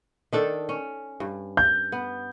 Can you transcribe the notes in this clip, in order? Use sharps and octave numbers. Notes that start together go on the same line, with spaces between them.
D#3 D4 A4
C#4
G2
G6
B3